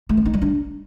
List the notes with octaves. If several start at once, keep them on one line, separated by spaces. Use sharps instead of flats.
A3
C4
D#4
G3
D4